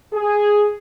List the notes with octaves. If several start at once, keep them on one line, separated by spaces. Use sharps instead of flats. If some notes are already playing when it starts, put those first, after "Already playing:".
G#4